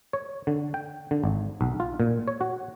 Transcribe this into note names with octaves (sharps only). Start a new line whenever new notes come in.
C#5
D3
G5
D3
G#1
B1
F4
A#2
C#5
F#4